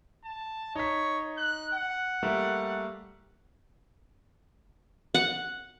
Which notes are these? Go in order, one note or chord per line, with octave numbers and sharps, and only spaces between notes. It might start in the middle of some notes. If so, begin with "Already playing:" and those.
A5
D#4 C#5 B6
F#6
F#5
G3 A3 A#3
F#5